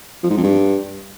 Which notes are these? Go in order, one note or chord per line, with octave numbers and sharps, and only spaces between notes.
F3
G#2
F2
G2